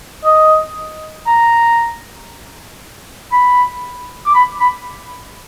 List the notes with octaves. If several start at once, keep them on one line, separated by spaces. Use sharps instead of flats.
D#5
A#5
B5
D6
B5
B5